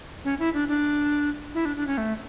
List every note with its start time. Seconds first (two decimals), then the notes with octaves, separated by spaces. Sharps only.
0.24 C#4
0.39 E4
0.54 D4
0.68 D4
1.54 E4
1.65 D4
1.77 D4
1.87 C#4
1.98 A3